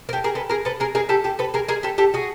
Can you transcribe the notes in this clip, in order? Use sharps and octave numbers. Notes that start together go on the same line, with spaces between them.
A#4
G4 A4
G#4 A#4
A4 B4
G#4 A#4
A4 B4
G#4 A#4
G#4 A#4
G4 A4
G4 A4
A4 B4
G#4 A#4
G#4 A#4
G4 A4
G4 A4
F#4 G#4